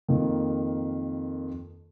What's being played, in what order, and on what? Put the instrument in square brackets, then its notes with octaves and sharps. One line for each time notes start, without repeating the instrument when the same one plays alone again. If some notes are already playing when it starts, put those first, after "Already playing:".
[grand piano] F2 D#3 A#3